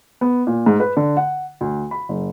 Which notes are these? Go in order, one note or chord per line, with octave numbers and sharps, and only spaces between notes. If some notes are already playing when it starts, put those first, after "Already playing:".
B3
A#2
G#2
B4
D3
F#5
D2
B5
F#1